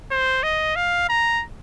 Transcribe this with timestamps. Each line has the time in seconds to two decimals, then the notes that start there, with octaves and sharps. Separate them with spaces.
0.11 C5
0.43 D#5
0.76 F5
1.09 A#5